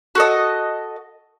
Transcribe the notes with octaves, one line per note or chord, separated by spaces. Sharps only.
F#4 A4 D#5